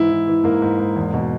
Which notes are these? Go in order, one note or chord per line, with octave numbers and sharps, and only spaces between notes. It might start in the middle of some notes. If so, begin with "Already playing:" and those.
Already playing: G#2 E3 E4
E3
E3
G#2 A#3
G#2
G#2
E2
B2